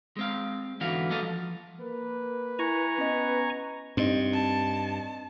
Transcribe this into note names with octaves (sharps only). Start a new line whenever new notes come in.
G#3 C4 F5
G#2 D3 E3 B3 F#4 F5
F#3 A#3 F#4 A4 D#5 F5
F3
A#3 B4
E4 G#5 A#5 C#6
B3 C#4 D#5
G2 C4 D#4
A5